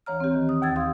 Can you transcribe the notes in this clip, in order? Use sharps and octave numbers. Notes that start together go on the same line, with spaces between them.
D2 E3 C#5 A#5 F6
C4 G4
D#3
D#6
D#2 E6 G#6 A6
G4 F5 C6 D#6